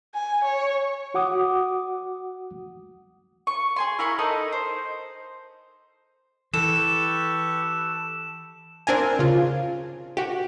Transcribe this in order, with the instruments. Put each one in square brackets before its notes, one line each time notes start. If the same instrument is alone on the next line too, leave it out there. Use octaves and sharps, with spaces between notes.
[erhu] G#5
C#5
[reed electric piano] F#4 F#5 D6 D#6
[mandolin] C#6
G#4 G#5 C6
E4 A#4 B5 C#6
D#4 A4 A#4 D#5
C5
[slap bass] E3 [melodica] G4 B4 C#6 [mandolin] A4 [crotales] E7
[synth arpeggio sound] C4 D4 A#4 G#5
C#3 F4
F#4 G4